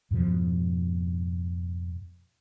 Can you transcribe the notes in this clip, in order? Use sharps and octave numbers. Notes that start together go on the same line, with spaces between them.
F2 G#2 B2 F3